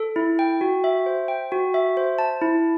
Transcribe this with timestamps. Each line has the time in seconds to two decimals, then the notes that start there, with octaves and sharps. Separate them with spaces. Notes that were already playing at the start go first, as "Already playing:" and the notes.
Already playing: A4
0.16 E4
0.39 G5
0.61 F#4
0.84 E5
1.06 C5
1.28 G5
1.52 F#4
1.74 E5
1.97 C5
2.19 A5
2.41 E4